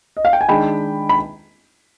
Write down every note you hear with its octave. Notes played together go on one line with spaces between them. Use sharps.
D#5
F5
G5
G#5
D#3 G#3 D4 G5 B5
B5